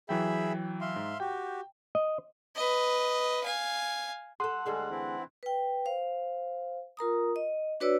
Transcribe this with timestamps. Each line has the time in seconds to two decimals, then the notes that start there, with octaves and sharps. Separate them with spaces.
0.09 E3 F#3 G#4 E5 G5 B5
0.81 E5 F5 C6
0.96 G#2
1.20 F#4 G4 G5
1.95 D#5
2.56 B4 D#5
3.43 F5 G#5
4.40 G#4 A4 F#5 C6 F#6
4.66 D2 G3 G#3 G#4 A4
4.91 E3 C4 E4
5.43 B4 G5
5.86 C5 F5
6.97 F4 A#4 A#5 D#6
7.36 D#5
7.80 D4 F#4 B4 C#5 D5 E6